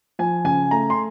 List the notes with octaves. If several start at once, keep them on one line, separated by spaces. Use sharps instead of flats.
F3 G#5
C#3 G#5
A3 A#5
C6